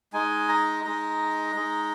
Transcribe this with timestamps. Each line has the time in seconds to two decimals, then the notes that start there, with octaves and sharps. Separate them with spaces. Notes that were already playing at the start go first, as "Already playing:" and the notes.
0.13 G#3 D#4 G#5
0.49 A#5
0.84 G#3 D#4 A#5
1.55 G#3 D#4